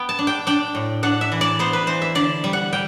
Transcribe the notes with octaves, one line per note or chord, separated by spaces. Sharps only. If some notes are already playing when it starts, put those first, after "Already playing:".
Already playing: B3 G5
A5
D4
G5
D4 G5
A2
D4 F#5
E5
E3
D5
B3 C5
B4
E3 C5
E5
D3 D5
G3
F#5
G3 G5